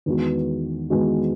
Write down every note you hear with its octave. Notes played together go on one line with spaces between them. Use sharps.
E2 D#3 G#3 B3 F#4
E2 D#3 G#3 B3 F#4